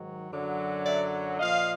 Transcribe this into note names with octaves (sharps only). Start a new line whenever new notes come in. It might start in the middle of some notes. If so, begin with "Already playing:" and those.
Already playing: G#2 D#3 F#3
F#2 D3 F#3
D5 E5
A#2 F3 D#5 F5